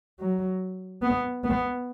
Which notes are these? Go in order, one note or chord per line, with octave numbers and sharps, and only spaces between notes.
F#3
B3
B3